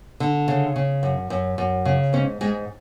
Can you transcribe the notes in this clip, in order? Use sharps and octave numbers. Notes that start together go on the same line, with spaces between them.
D3
C#3
C#3
F#2
F#2
F#2
C#3
G#2 C#4
G#2 G#3